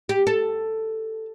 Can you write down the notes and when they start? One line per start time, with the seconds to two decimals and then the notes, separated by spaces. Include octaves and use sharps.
0.09 G4
0.27 A4